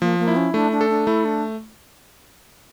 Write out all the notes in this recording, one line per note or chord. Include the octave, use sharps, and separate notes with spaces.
F3 A#3
A#3
E4
C#4
A3 D4
D4
A4
D4
A3 E4
D4